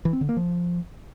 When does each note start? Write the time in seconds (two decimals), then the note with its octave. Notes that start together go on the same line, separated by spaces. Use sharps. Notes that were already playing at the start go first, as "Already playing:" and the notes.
0.05 E3
0.13 C4
0.21 D3
0.29 A#3
0.37 F3